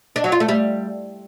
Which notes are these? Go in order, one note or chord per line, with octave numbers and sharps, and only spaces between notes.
D4
F#3
F4
A3
G3